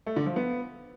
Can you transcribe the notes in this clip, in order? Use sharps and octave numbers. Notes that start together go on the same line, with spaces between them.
A3
D3
F3
B3